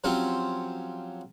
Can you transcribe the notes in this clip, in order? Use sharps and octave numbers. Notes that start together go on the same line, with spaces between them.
F3 F#3 C4 C#4 F4 G4